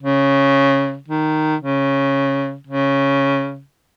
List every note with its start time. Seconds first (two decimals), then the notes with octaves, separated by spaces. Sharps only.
0.03 C#3
1.08 D#3
1.61 C#3
2.67 C#3